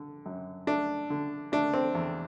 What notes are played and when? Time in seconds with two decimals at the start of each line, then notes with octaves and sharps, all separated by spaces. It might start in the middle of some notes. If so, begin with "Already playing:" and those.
Already playing: D3
0.26 F#2
0.67 A3 D4
1.10 D3
1.52 A3 D4
1.74 C4
1.95 E2